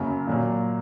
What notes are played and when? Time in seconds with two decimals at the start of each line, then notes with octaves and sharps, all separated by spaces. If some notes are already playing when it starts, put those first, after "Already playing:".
Already playing: F#2 C#3 F#3 A#3
0.27 A#2 F#3 A#3